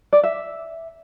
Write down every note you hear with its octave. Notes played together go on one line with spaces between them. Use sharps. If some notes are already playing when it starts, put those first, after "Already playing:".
D5
E5